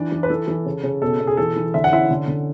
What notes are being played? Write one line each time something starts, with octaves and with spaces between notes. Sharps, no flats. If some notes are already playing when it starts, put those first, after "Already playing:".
Already playing: E3 D4
E3
B4
E3 A4
E3
C#3
C#3
B2 A4
B2
G#4
E3 A4
E3
D3 E5
F#5
C#4 E4 E5
D3
D3